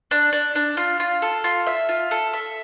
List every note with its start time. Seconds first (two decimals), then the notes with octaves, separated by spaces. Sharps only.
0.11 D4
0.33 D4
0.55 D4
0.77 F4
1.00 F4
1.22 A4
1.44 F4
1.67 E5
1.89 F4
2.11 A4
2.33 E5